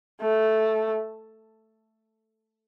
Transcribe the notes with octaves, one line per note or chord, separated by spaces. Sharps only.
A3